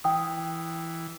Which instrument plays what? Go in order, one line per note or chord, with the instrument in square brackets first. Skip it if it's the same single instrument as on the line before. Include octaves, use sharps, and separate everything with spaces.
[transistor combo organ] E3 [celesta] G5 D#6